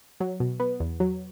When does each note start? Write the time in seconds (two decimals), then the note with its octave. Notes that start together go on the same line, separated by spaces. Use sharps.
0.20 F#3
0.40 B2
0.60 B3
0.80 E2
1.00 F#3